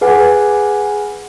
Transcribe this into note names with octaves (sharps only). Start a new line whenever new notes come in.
G#4 B4 F#5 G#5